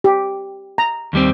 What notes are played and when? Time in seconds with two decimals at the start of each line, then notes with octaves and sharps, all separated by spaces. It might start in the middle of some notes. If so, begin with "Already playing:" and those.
0.04 G4
0.78 A#5
1.13 D#2 G3 C4